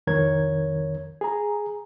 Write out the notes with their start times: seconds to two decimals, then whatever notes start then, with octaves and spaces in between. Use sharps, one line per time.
0.07 C2 F2 D#3 A#4 C#5 G#6
1.21 G#4 A#5